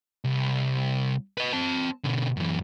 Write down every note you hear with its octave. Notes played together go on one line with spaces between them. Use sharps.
C2
B4 D#5
C4 A5
B2 D3
F#2 E3